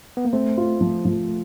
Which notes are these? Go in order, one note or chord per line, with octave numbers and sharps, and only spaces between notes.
B3
A#3
A3 C4
F4
F3
F3